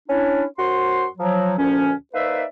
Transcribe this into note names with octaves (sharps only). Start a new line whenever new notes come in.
C#4 D4 E4
F#2 F#4 C5 C6
F3 F#3
D2 A#2 F3 C#4
A#3 D#4 B4 C5 D5 E5